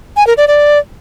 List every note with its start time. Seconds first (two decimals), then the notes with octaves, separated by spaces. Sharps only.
0.17 G#5
0.27 A#4
0.37 D5
0.48 D5